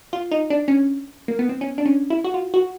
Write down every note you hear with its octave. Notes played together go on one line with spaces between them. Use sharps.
F4
D#4
D4
C#4
A#3
B3
C4
C#4
D4
C#4
E4
F#4
F4
F#4